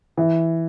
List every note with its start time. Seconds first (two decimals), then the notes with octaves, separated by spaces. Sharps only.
0.17 E3